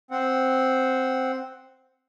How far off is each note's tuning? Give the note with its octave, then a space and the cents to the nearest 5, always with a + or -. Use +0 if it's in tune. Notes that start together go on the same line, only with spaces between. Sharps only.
C4 +0 F#5 +0